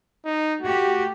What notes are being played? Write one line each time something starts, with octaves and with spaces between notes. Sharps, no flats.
D#4
A3 F#4 G4